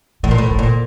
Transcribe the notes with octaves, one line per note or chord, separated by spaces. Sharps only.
A2 E3
A#2
A2 E3
D#3
A#2 D3